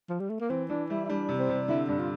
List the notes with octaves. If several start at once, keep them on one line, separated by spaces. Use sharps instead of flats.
F3
G3
A3
A#3
E3 C4
E3 D4
G3 E4
E4
G3 D4
C3
C4
C3
D3 E4
G2 D4
F4